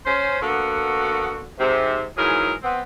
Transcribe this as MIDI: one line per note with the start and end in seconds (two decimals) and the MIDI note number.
0.06 0.40 61
0.06 0.40 72
0.42 1.46 50
0.42 1.46 58
0.42 1.46 59
0.42 1.46 66
1.59 2.06 44
1.59 2.06 48
2.18 2.53 44
2.18 2.53 52
2.18 2.53 54
2.18 2.53 68
2.18 2.53 70
2.63 2.81 59
2.63 2.81 60